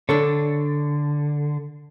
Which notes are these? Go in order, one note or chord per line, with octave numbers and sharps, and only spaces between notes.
D3 D4 A4 C#5